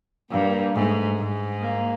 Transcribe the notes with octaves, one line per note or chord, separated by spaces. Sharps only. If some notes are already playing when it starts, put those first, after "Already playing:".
G2 A#3
G#2 A3
G#2
A#3